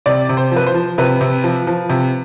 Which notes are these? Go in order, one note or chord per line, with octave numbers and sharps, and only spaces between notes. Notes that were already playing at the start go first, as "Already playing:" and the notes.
C3 D5
C3
C5
F3 B4
C5
F3
C3 B4
C3
F3
F3
C3